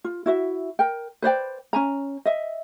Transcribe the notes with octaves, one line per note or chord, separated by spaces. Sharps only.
F4
E4 F#4 E5
A#4 G5
B4 C5 D5 G5
C#4 G#5 A#5
D#5 E5